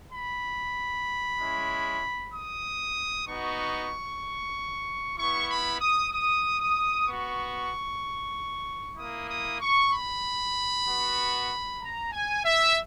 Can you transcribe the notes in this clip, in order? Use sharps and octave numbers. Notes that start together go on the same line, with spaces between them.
B5
G#3 C#4 E4
D#6
B3 D#4 F#4 C#6
B3 E4 C#6
B5
D#6
D#6
D#6
B3 F#4 C#6
A#3 E4 D#6
D#6
C#6
B5
B3 F#4
A#5
G#5
E5